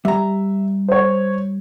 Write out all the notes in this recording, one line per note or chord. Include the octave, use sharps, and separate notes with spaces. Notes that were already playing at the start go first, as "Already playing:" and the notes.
G3 E5 A#5
C5 C#5